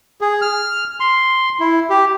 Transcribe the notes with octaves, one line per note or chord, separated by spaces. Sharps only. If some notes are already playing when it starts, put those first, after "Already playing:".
G#4
F6
C6
E4
G4